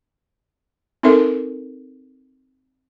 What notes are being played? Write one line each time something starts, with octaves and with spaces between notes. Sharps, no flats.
C4 D#4 A4 A#4 E5